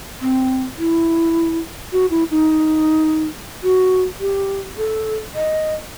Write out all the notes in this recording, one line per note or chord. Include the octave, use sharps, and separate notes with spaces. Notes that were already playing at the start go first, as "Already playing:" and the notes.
C4
E4
F#4
E4
D#4
F#4
G4
A4
D#5